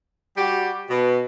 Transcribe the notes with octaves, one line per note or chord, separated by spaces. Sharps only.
G3 F#4 G4
B2